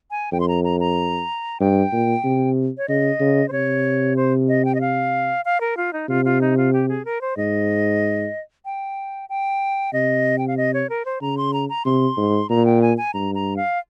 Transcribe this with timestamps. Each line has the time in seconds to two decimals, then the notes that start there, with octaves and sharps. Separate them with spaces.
0.11 G#5
0.32 F2 G5
0.40 C6
0.48 A#5
0.64 A#5
0.80 A#5
1.60 G2 G5
1.92 A#2
2.24 C3
2.78 C#5
2.88 C#3 D#5
3.20 C#3
3.48 C5
3.52 C3 C#5
4.16 C5
4.48 D#5
4.65 G5
4.75 D#5
4.81 F5
5.45 F5
5.61 A#4
5.77 F4
5.93 D#4
6.09 C3 F4
6.25 F4
6.41 D#4
6.57 F4
6.73 G4
6.89 G#4
7.05 A#4
7.21 C5
7.37 G#2 D#5
8.65 G5
9.29 G5
9.93 C3 D#5
10.38 G5
10.48 F5
10.57 D#5
10.74 C#5
10.89 A#4
11.05 C5
11.21 C#3 A#5
11.37 C6
11.53 A#5
11.69 A#5
11.85 C3 C6
12.17 G#2
12.49 A#2 A#5
12.66 G5
12.82 G#5
12.98 G#5
13.14 G2 A#5
13.35 A#5
13.57 F5